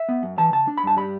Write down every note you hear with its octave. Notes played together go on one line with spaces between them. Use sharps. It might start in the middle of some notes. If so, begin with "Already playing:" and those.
Already playing: E5
B3
F#2
E3 A5
C#3 A5
D4
B5
G2 A5
G3 B5